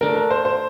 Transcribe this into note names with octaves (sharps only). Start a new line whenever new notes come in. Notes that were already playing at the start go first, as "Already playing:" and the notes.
A3 D4 A4 A#4
A#4
C5
C5